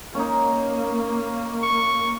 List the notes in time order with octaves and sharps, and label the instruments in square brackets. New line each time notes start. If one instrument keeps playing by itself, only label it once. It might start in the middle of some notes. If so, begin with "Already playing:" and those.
[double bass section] A#3 [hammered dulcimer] C#4 D#4
[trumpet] C#6